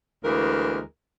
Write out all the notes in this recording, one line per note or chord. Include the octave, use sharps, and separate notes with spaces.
D2 E3 G#3 A#3 A#4